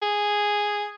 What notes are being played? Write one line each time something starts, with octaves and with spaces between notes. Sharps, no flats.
G#4